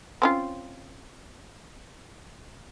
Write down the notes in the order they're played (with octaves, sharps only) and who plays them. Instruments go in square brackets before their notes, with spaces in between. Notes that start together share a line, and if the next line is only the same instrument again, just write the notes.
[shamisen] C4 C#4 F4